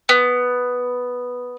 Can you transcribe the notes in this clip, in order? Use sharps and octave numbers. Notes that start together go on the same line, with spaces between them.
B3